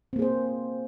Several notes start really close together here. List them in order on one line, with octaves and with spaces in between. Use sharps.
C4 A#3 G#4 C5